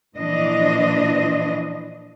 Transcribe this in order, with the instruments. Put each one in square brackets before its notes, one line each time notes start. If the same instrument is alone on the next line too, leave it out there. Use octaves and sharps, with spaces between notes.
[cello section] A#2 E3 F3 D4 D#5